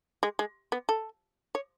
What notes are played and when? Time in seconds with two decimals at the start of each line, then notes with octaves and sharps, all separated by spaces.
0.23 G#3
0.39 G#3
0.72 B3
0.89 A4
1.55 C#5